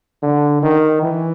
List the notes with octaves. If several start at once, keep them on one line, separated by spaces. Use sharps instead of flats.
D3
D#3
E3